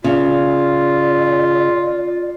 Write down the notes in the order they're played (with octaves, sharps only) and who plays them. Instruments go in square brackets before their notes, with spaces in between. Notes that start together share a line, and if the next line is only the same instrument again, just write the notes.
[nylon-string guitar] C#3 [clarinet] F4 [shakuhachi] D5